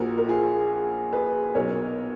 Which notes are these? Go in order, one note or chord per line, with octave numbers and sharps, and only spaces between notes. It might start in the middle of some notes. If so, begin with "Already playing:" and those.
Already playing: A#1 A#2 F3 F#4 A#4
A#4
F4 G#4
G#4 B4
B1 B2 A#4 C#5